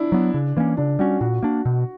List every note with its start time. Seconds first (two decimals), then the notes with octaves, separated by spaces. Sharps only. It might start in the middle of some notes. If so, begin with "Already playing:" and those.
Already playing: D4 E4
0.12 F#3 B3
0.34 C#3
0.57 E3 A#3 C#4
0.77 C#3 D4
0.99 G3 C#4 F#4
1.21 A#2 F#4
1.43 A#3 D4
1.65 B2